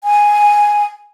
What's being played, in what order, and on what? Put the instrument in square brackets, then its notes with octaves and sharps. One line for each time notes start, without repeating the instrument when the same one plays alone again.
[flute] G#5